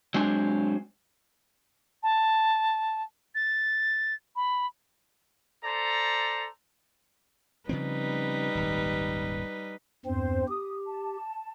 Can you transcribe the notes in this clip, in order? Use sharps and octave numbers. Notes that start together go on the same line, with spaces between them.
F#3 G#3 C4 D4 G#5
A5
A6
B5
A4 C5 D5 A#5
C#3 F3 G3 C4 D#4 B4
D#1 G#1
E2 G2 C4 C5
G4 D#6
A5